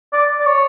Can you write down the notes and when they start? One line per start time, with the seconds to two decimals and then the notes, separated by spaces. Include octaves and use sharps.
0.13 D5
0.40 D5
0.46 C#5